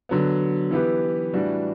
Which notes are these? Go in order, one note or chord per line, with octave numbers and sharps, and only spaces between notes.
D3 F#3 B3
E3 B3 E4 G4 B4
A2 E3 G3 D4 F#4